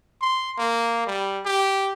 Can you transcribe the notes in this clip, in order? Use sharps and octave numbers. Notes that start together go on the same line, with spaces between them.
C6
A#3
G3
G4